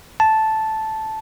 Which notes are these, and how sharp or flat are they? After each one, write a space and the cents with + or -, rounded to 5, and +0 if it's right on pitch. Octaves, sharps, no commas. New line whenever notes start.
A5 -5